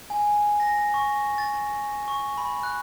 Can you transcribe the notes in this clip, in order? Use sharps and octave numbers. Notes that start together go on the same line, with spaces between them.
G#5
A#6
C#6
A6
C#6
B5
F#6